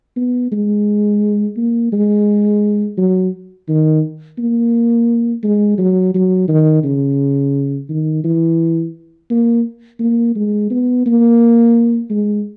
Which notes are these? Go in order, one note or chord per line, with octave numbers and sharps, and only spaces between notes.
B3
G#3
A#3
G#3
F#3
D#3
A#3
G#3
F#3
F#3
D#3
C#3
D#3
E3
A#3
A#3
G#3
B3
A#3
G#3